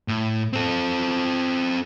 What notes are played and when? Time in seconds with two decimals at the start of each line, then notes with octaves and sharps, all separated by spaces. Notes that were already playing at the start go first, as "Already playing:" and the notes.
0.08 A2
0.53 C4 A4